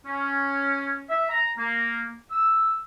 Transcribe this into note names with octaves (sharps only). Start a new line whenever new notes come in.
C#4
E5
A#5
A#3
E6